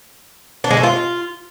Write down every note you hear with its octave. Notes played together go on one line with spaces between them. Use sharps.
D4
G#3
A3
F4